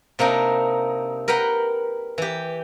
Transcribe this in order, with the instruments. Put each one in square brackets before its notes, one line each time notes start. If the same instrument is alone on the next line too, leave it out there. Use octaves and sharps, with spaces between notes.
[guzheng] C3 A#3 D4 D#4
A#4 B4 F#5 G5 A#5
E3 G4